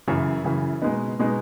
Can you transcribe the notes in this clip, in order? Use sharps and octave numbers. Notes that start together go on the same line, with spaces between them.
F#2 C#3 E3
F#2 C#3 E3
B2 G#3 B3 D#4
B2 G#3 B3 D#4